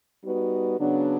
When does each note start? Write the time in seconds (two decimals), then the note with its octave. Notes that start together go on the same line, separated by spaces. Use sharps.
0.23 G3 B3 D#4 F#4 B4
0.79 C#3 F#3 B3 D4